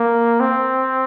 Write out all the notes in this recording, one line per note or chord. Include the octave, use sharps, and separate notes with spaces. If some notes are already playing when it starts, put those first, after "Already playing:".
Already playing: A#3
C4